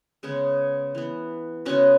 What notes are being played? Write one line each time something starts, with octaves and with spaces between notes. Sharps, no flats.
C#3 G#3 B3
E3 B3
C#3 G#3 B3 C#4 F#4